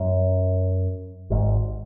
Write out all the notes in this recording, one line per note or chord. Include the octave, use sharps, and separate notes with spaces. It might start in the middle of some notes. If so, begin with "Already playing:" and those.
Already playing: F#2
G#1 G#2